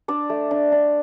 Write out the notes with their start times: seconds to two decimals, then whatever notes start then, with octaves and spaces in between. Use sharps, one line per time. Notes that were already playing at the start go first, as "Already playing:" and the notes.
0.08 D4 D5
0.30 A3
0.51 D4
0.72 D4